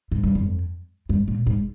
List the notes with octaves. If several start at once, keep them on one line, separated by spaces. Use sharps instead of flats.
G#2
G2
F2
G2
A#2
G#2